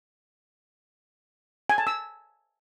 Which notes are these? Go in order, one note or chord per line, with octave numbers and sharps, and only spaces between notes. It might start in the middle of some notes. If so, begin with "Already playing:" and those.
G#5
A5
E6